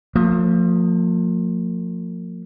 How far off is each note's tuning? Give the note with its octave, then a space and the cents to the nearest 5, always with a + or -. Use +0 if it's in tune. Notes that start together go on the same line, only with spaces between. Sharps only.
F3 +25 A#3 -40